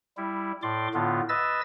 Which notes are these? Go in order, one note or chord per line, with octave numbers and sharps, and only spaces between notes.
G3 E4
A2 D5 C6 D6
A2 D3 B3 F4
B4 D#5 E5 E6 A6